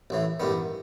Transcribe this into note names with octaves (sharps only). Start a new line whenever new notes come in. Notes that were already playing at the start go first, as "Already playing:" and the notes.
A1 A2 E3
A1 G2 D#3 B3